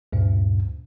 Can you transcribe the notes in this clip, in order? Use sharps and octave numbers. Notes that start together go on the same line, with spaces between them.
D2 G2 A#2